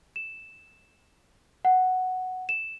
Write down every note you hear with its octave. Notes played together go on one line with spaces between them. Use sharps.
E7
F#5
E7